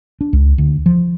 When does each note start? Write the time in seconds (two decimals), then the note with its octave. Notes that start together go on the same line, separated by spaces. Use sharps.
0.21 D4
0.33 C#2
0.58 D2
0.86 F3